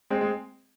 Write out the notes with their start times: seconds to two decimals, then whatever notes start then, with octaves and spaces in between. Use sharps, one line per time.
0.10 G#3 C4
0.21 G#3